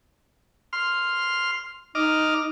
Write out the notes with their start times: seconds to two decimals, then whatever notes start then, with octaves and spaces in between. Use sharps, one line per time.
0.73 C6 F6
1.95 D#4 D#5 D6 F6